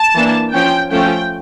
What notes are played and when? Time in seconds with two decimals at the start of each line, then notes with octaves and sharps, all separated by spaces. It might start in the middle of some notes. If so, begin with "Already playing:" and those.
Already playing: A5
0.15 E3 A#3 D4
0.53 F3 C#4 G5
0.92 F3 A3 C#4 G5